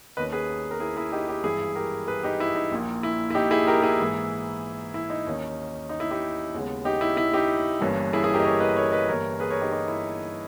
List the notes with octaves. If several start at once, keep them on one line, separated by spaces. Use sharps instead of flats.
D#2 D#3 A#3 C#4 B4 D#5
G#4 B4
A#4
E4 G#4
E4 G#4
D#4 G4
D#4 G4
G#1 G2 E3 E4 G#4
G4 A#4
G#4 B4
D#4 G4
E4
D#4
A#1 A#2 A#3
E4
E4
D#4 G4
E4 G#4
G4 A#4
E4 G#4
G#2 E3 A#3
E4
D#4
D#2 D#3 A#3 C#4
D#4
E4
D#4 G4
D#2 C#3 G#3 B3
D#4 G4
E4
E4
D#4 G4
G1 G2 E3 A#3 C#4
E4 G#4
E4 G#4
G4 A#4
D#5
A#4 C#5
B4 D#5
A#4 C#5
B4 D#5
G1 G2 E3 A#3 A#4 C#5
G#4 B4
A#4 C#5
D#4 G4
D#4 G4
E4